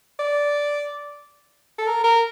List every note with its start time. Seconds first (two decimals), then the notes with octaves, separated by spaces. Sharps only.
0.20 D5
1.78 A4
1.87 A#4
2.04 A#4